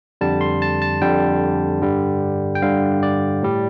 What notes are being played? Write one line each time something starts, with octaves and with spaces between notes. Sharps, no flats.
F2 D3 G3 A5
C6
A5
A5
F2 D3 G3 G5
G2 D3 G3
G5
G2 D3 G3 F5
D5
A2 G3